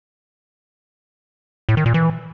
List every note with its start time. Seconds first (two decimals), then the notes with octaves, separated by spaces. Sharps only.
1.69 A2
1.77 D#3
1.86 A#2
1.94 E3